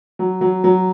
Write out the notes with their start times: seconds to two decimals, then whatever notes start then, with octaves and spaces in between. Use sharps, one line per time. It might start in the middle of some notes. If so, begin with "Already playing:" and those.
0.19 F#3
0.41 F#3
0.64 F#3